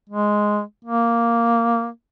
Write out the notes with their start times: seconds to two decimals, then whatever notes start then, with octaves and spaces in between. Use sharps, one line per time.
0.10 G#3
0.85 A#3